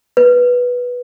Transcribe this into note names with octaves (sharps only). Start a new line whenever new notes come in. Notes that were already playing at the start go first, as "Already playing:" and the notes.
B4